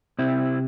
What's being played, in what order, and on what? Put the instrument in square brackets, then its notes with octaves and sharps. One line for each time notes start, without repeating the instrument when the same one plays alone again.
[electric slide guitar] C3 C4 E4